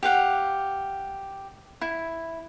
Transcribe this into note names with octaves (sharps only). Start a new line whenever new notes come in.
G4 F5 F#5
E4